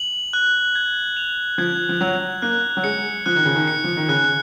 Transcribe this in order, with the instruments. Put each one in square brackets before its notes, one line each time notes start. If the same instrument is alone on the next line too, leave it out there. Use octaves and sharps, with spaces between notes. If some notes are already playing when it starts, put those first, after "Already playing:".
Already playing: [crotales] F#7
F#6
G#6
F7
[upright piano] F3 [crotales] G#6
[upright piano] F3
[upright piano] F#3 [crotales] F7
[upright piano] A#3 [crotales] F#6
[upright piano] F#3
[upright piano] G#3 [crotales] C#7
[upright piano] F3 [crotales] F#6
[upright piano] D#3
C#3
D#3
[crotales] C#7
[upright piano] F3
D#3
[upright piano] C#3 [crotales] F#6